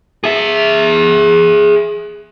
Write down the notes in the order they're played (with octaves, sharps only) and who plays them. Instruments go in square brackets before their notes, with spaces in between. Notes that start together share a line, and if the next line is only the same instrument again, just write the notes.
[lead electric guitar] G#4 E5